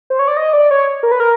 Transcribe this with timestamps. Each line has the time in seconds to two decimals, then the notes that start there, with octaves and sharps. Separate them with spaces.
0.10 C5
0.19 C#5
0.28 D5
0.37 D#5
0.53 D5
0.71 C#5
1.03 A#4
1.12 B4
1.20 A#4